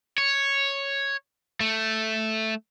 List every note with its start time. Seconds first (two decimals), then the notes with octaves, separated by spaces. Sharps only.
0.18 C#5
1.60 A3